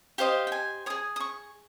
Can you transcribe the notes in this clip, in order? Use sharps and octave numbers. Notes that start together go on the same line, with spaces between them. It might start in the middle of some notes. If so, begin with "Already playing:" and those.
G4 C5 D#5 F5
G5
G#5
G#4 C#5 D#6
D#6
C#6